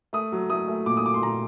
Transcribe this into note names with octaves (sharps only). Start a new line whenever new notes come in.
A3 D#6
F#3
A3 D#6
A3
A#2 D6
D#6
F#3 D6
C6
A#2 A#5